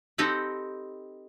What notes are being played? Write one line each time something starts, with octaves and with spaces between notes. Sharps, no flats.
C4 D#4 G4 A4 B4